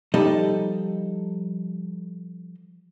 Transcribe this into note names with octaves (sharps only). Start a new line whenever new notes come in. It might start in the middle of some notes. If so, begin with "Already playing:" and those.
F3 G3 D#4 A4 D#5